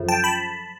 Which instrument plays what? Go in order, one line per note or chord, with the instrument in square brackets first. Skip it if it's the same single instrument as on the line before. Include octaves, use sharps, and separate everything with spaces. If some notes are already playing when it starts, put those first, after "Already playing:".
Already playing: [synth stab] F#2 C#3 F3 A3
G5 A5
A5 B5